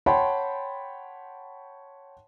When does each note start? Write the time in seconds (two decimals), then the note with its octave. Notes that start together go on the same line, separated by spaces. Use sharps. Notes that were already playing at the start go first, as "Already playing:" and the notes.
0.06 C#5 F#5 G5 A5 B5 C6